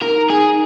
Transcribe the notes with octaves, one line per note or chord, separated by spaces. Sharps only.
D#4 A#4
G#4